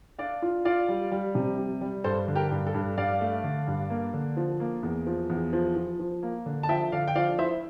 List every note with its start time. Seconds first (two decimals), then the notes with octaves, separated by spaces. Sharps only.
0.18 D4 D5 F5
0.42 F4
0.65 F4 D5 F5
0.88 G3
1.12 G3
1.35 C3
1.58 G3
1.81 G3
2.04 G2 A4 C5
2.28 D3
2.36 G4 A#4
2.51 G2
2.67 A4
2.74 G2
2.97 G2 D5 F5
3.21 A3
3.44 D3
3.67 G2
3.90 A#3
4.14 D3
4.37 F3
4.60 A#3
4.83 E2
5.07 F3
5.30 E2
5.53 F3
5.76 F3
6.00 F3
6.23 A#3
6.46 D3
6.63 A5
6.69 F3 E5 G5
6.92 D3 D5 F5
7.08 G5
7.15 F3 D5 F5
7.39 E4 C5 E5